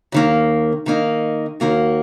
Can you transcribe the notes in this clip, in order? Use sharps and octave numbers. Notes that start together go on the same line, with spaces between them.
D#2 D#3 A#3
D#3 A#3 D#4
D#2 D#3 A#3 F#4